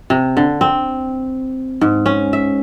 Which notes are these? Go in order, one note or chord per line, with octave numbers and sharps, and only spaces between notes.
C3
D3
C4
G#2
C#4
E5